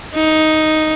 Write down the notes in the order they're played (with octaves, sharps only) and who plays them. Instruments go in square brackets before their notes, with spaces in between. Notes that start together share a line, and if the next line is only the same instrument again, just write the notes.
[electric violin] D#4